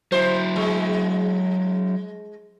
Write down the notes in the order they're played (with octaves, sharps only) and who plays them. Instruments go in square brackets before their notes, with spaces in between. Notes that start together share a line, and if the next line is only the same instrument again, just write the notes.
[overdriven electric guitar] F#3 E4 [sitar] C5
[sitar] G#3